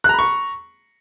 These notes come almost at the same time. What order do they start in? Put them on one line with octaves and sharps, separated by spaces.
F#6 A#5 B5 C#6